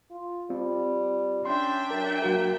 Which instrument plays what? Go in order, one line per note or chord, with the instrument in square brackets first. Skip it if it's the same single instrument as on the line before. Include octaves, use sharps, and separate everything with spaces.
[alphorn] F4
[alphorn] G3 [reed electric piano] C4 F4
[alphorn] C#4 [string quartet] D4 E5 G5 [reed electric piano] C6
[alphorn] F#3 [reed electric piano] A#4
[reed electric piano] F#3 F#4 A#4 [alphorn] A#3